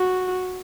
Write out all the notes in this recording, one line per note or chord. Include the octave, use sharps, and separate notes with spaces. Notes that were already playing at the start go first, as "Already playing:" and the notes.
Already playing: F#4